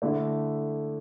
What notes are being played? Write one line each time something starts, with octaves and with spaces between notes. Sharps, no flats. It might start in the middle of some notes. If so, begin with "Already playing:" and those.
D3 A3 E4